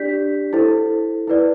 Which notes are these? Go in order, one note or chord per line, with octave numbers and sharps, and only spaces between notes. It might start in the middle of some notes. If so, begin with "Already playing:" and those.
Already playing: D4 G4 D5 G6 B6
E4 A4 C5
E4 B4 D5